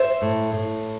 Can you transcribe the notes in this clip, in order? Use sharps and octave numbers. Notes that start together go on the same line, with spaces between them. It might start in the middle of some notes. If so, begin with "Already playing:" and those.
Already playing: C5 E5
A2
A2